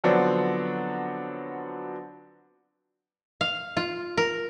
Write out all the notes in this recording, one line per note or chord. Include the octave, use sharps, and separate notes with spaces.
D3 F3 F#3 B3 C4 D4
F5
F4
A#4